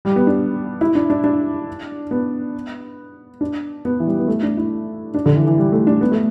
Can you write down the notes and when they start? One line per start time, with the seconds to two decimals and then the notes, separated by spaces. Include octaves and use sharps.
0.05 G3
0.16 B3
0.27 D4
0.81 E4
0.95 D4
1.10 D4
1.24 D4
2.11 B3
3.41 D4
3.85 B3
4.00 E3
4.06 G3
4.19 B3
4.28 A3
4.43 D4
4.57 E4
5.14 D4
5.26 D3
5.36 E3
5.47 E3
5.58 G3
5.72 A3
5.87 D4
6.01 B3
6.12 A3